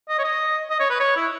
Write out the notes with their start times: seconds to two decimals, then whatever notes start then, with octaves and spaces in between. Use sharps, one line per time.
0.08 D#5
0.18 C#5
0.24 D#5
0.70 D#5
0.80 C#5
0.90 B4
1.00 C#5
1.16 E4